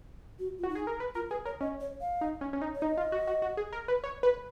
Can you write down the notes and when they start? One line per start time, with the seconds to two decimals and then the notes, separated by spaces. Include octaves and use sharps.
0.39 F#4
0.58 F4
0.63 F#4
0.69 D#4
0.75 G#4
0.87 A#4
1.00 B4
1.15 F4 A#4
1.30 G#4 B4
1.45 A#4 C#5
1.61 C#4 D#5
1.81 C#5
2.01 F5
2.21 D#4
2.41 C#4
2.53 C#4
2.62 D#4
2.75 C#5
2.82 D#4 D#5
2.98 F4
3.12 F#4
3.27 F#4
3.42 F#4
3.57 G#4
3.73 A#4
3.88 B4
4.04 C#5
4.23 B4